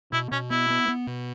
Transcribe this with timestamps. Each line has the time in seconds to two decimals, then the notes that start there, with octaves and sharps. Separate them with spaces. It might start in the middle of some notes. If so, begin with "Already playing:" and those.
0.12 B2 E4
0.31 B2 C#4
0.50 B3 E4
0.70 B3
0.88 B3
1.07 B2